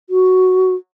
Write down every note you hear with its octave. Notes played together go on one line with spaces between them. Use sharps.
F#4